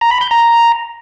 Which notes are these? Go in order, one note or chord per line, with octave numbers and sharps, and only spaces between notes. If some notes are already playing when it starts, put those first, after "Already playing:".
A#5
B5
G6
A#5